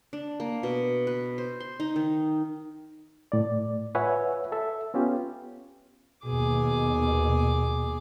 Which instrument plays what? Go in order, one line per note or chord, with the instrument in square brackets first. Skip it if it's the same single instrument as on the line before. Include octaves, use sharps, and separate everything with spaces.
[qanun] D4
A#3
B2
B4
C5
C6
D#4
D#3
[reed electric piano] A2 D5
F4 B4 C#5 E5 F#5 G#5
A4 E5
B3 C#4 F4 G4
[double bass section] D#2 B2 [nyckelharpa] G#4 D6